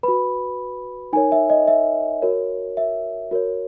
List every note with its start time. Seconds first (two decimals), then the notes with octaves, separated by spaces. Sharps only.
0.03 F#4 B4 B5
1.13 D#4 A#4 C#5 G#5
1.32 E5
1.50 D#5
1.67 E5
2.22 F#4 A#4 C#5
2.77 E5
3.31 F#4 A#4 C#5